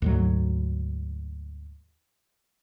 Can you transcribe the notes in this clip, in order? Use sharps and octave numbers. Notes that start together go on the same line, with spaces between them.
D2 G#2 F#3